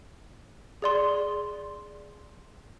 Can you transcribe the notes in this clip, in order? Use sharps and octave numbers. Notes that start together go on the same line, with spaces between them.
G#4 D5 C6